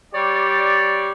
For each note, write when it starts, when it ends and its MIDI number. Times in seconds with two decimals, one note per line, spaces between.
0.14 1.10 55
0.14 1.10 67
0.14 1.10 73
0.14 1.10 74